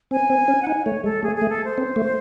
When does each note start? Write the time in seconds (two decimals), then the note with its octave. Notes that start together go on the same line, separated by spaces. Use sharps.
0.11 C4 G#5
0.30 C4
0.48 C#4
0.62 F#5
0.67 D#4 G#5
0.85 A3 C#5
1.04 G#3 A4
1.23 A3 G#4
1.36 G#4
1.42 A3
1.50 A4
1.65 C5
1.78 C4
1.96 A3